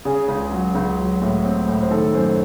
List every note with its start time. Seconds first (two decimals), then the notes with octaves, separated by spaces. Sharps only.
0.05 C#3 G#4
0.28 C#2
0.51 F#3
0.75 C#2
0.99 F#3
1.22 A2
1.45 C4
1.68 A2
1.83 C5
1.91 D#3 A4
2.15 F#2 C5